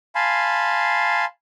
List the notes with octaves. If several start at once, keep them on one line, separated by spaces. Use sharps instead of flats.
F5 G#5 A5 B5 C6